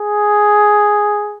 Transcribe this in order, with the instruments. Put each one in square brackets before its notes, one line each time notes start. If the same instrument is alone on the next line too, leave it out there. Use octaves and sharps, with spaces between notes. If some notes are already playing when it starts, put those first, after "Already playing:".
Already playing: [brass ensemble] G#4